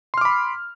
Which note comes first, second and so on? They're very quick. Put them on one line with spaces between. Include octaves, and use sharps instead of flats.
C6 F6 D6 B5